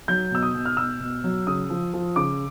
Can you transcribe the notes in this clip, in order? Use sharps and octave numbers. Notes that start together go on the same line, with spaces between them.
F#3 G6
B2 E6
D#6
B2
F6
B2 E6
B2
F#3
C#3 D#6
F3
F3
C#3 D6